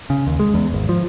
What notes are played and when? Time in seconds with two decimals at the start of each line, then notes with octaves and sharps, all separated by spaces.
0.10 C#3
0.27 D#2
0.40 G#3
0.54 E2
0.73 G#1
0.89 F3